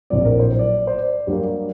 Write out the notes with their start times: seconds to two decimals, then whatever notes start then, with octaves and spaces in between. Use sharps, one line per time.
0.10 A#1 A2 F#3 C4 D5
0.25 A#4
0.40 C5
0.59 D5
0.87 C5
0.98 D5
1.27 G2 F#3 A#3 G4